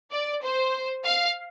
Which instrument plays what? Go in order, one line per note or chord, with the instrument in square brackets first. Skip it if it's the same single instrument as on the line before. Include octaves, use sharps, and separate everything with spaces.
[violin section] D5
C5
F5